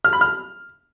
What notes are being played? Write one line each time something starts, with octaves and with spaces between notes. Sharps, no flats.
F6
B5
F6